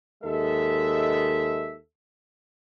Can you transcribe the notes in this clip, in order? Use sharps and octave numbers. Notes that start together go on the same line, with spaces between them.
D#2 G#3 A4 E5